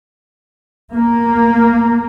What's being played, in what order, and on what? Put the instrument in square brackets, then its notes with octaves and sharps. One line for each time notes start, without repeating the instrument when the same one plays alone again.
[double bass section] A#3